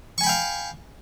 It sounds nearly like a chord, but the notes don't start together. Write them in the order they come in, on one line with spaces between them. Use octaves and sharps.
C#6 G#5 B5 G5 F5